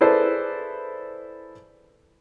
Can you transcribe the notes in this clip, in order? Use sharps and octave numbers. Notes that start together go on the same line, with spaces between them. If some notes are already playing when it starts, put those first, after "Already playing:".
E4 G#4 A4 B4 C5 D5